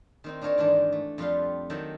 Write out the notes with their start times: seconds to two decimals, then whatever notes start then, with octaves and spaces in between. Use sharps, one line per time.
0.24 D#3 C4 D#4
0.41 D4 D#4 F4 A#4 C#5 D5
0.58 G#2 D#3 E3 D4
0.92 A3
1.18 F2 G3 F4 B4 F5 C6
1.70 D#3 F#3 A4 E5 G5